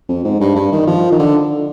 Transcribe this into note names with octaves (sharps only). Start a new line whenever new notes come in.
F2
G#2
G2
G2
D#3
F3
D#3
D3